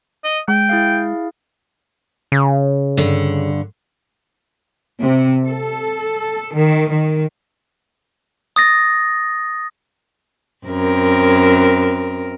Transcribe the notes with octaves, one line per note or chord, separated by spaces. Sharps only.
D#5
G#3 G5
E4 G#4 F5
C#3
G2 D3
C3
A4
D#3
D#3
D#6 A6 A#6
F#2 C4 A#4